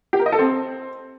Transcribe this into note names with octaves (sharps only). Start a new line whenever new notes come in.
G4
A#4
D#5
A4
C4